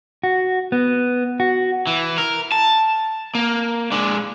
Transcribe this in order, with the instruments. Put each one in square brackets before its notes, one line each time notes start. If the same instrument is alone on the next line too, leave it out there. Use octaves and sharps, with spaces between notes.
[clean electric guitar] F#4
B3
F#4
[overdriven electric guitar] E3
A#4
A5
A#3
G#3 D4